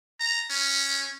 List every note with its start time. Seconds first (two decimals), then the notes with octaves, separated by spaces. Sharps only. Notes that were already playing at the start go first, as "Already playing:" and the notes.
0.20 A#5
0.50 C#4